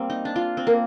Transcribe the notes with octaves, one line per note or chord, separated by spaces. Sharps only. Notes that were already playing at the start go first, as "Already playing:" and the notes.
Already playing: G3 A#3 C4
D#4
D4
F4
C4
A#3 A#4